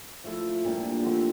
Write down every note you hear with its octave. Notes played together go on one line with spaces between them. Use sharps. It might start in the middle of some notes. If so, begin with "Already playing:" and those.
F3 A3 E4 A4
A#2 G3 D4 G4
D3 F3 A3 C4